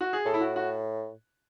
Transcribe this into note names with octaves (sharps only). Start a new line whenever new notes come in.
F#4
G#4
A2 A4
E4
F#4
F#4